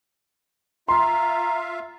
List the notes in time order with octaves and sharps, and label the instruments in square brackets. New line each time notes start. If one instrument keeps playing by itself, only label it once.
[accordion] F4 E5 F5 [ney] A#5 [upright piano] C6